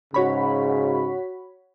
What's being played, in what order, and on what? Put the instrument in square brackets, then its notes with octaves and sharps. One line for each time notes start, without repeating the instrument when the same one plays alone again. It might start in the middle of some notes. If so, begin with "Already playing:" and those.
[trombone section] G#2 C#3 [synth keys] F#4 C#5 B5